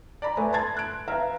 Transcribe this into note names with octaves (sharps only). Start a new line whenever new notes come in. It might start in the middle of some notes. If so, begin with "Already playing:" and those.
D5 A#5 B5
A3 B4 E5 G#5
A5 B5 C6 G#6 A6
F#6 D7
B4 E5 F5 A#5